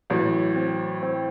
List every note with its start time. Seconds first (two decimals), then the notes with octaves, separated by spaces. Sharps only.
0.10 A1 A2 F#3
0.56 C4
1.03 C4